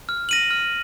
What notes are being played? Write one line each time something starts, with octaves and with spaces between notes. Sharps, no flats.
F6
A#6 D#7 F#7
F6